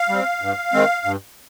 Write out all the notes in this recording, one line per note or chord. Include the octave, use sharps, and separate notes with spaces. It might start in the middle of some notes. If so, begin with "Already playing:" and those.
Already playing: F5
G3 C4
G2
D#3 G#3 C4
G2